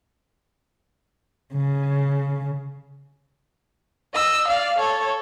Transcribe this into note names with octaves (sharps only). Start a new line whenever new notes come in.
C#3
D#5 E6
D5 F5
A4 C#5